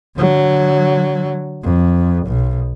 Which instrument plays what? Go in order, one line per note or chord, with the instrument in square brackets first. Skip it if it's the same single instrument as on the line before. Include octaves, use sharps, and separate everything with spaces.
[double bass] D3 F#3
F2
B1